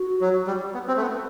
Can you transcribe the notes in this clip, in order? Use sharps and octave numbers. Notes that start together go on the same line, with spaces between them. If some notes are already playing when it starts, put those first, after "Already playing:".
Already playing: F#4
F#3
G3
B3
C4
A3
B3